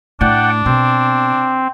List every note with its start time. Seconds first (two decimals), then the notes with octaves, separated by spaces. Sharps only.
0.21 A2 D4 D5 F#5 G5
0.66 B2 C4